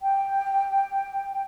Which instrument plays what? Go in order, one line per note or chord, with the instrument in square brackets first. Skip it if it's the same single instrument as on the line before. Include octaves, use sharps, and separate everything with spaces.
[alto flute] G5